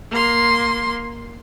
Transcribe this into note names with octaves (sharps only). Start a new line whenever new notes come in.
A#3 C6